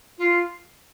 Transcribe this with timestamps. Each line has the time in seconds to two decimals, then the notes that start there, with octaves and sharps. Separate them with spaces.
0.18 F4